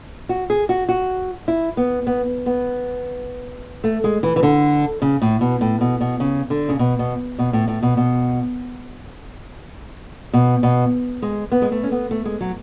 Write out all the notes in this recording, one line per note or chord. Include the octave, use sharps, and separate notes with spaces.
F#4
G#4
F#4
F#4
E4
B3
B3
B3
A3
G#3
E3
E3
D3
C#3
A2
B2
A2
B2
B2
C#3
D3
C#3
B2
B2
B2
A2
A2
B2
B2
B2
B2
G#3
B3
G#3
A3
C#4
B3
A3
G#3
F#3